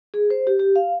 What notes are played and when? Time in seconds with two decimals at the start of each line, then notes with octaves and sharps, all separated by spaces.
0.14 G#4
0.30 C5
0.47 G4
0.59 G4
0.76 F5